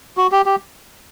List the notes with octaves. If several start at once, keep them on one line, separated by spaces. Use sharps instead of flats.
F#4
G4
G4